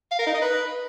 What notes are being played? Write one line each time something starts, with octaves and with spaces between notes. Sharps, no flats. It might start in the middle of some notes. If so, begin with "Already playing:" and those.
F5
A#4
D#4
D#5
B4